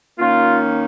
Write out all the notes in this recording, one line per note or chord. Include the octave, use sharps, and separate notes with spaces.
D#3 A#3 C#4 F4